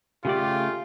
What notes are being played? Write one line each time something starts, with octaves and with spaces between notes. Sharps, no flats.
C#3 A3 F4 G4 D5